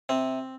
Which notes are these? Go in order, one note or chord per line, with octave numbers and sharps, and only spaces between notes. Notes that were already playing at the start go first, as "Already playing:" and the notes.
C3 C4